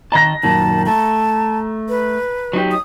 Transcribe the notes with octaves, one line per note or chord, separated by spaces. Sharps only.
D#3 D#5 A5 A#5 A#6
F#2 A#2 D#3 A5
A3 A5
B4
F#3 D#4 G4
D#6